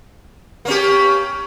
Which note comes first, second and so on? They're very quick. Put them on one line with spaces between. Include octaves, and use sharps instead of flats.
A#3 C#4 G4